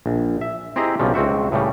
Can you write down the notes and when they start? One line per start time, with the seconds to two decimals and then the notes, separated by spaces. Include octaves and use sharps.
0.06 A#1
0.41 E5
0.76 C4 E4 G4 G#4 D#5 A#5
0.99 B1 C#3 F3 G3
1.14 C#2 C4 F#4 E5
1.52 A2 C#3 G3